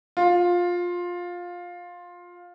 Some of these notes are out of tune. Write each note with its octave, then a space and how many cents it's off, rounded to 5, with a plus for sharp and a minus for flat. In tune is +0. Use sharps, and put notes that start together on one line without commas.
F4 +15